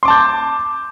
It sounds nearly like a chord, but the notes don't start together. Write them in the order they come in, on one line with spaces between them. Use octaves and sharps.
C6 D6 A5 G6